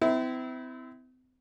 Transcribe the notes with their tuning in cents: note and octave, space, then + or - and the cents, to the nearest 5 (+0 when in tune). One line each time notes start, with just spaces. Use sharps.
C4 -40 E4 -20